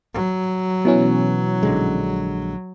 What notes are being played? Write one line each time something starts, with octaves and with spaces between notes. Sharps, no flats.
F#3
B2 E3 C#4
A#1 D3 G#3